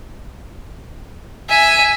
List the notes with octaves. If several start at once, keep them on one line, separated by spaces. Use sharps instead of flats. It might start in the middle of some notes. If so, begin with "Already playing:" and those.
E5 G#5